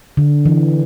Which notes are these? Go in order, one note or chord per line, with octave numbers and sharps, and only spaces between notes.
D3
E3